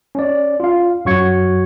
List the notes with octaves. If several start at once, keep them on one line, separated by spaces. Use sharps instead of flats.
C#4 D5
F4 F5
F#2 F#3 F#4 C#6 G#6 C#7